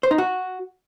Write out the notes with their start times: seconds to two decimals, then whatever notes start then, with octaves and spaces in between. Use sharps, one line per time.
0.03 C5
0.11 D#4
0.18 F#4